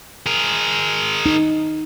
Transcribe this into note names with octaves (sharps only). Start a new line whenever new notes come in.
G#4 A#4
D#4